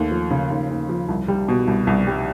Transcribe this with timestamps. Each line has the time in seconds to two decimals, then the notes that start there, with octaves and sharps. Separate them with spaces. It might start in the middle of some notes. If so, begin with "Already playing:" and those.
Already playing: D#2 A3
0.11 F3
0.30 C#3
0.50 D#2
0.70 D#2
0.89 F3
1.08 C2
1.28 G3
1.48 B2
1.68 C2
1.87 C2
2.07 G3